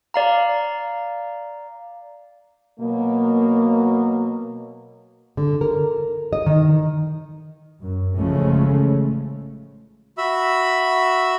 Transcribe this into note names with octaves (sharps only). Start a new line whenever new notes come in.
D5 F5 A#5
B2 F#3 A#3
D3
A#4
D#5
D#3
F#2
A1 C#3 F3 G#3 A3 C#4
F#4 E5 B5 E6